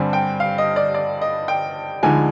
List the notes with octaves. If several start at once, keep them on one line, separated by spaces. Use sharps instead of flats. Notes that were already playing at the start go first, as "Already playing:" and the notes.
Already playing: G2 D3 G3 C4 G#5
G5
F5
D#5
D5
D5
D#5
G5
D2 D3 F3 G#3 D#4 G#5